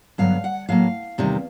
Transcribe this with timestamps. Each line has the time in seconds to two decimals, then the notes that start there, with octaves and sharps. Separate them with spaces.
0.18 G2 D3 F#3 B3 F5
0.44 F#5
0.69 A2 F#3 A#3 F5
1.18 E2 C3 D#3 G3